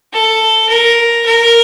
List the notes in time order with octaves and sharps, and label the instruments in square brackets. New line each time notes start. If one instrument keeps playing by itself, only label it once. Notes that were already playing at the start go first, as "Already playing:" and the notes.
[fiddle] A4
A#4
A#4